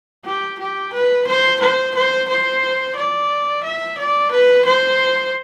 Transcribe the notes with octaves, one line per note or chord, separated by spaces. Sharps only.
G4
G4
B4
C5
C5
C5
C5
D5
E5
D5
B4
C5